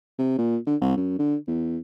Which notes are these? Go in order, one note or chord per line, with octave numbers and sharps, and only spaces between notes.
C3
A#2
D3
C2
F#2
D3
E2